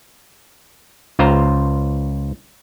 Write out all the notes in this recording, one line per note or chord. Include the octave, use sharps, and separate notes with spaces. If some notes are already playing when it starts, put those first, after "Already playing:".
C#2 F4 C5 A#5